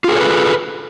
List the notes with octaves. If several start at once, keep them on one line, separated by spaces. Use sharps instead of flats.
F4 G#4 A4 B4 C#5